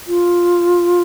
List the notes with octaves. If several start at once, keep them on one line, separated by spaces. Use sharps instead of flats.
F4